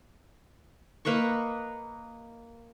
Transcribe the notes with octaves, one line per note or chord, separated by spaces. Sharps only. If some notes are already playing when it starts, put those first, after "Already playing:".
A#3 B4 D#5 C#6